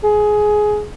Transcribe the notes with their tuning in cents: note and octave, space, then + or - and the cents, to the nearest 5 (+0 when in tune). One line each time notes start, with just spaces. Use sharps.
G#4 +15